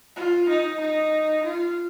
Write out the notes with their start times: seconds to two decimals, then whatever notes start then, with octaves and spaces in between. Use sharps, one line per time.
0.16 F4
0.49 D#4
0.80 D#4
1.45 F4